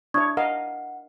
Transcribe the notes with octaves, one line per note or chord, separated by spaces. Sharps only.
D4 E4 C#5 C#6 D#6 G#6
A#4 D#5 F5 F#5